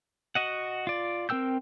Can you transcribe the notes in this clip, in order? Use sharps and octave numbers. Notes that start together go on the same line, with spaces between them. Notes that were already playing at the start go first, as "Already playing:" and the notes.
F#4 D#5 F#5
F4 D5
C4 A#4 G5 E6 G6